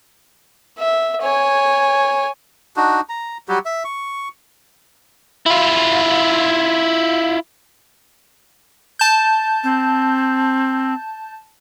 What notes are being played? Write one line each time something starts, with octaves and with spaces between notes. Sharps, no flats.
E5
C#5 G#5
D4 D#4 F#4
A#5
F#3 G3 F#4 G4
E5
C#6
E4 F4
A5 G6
C4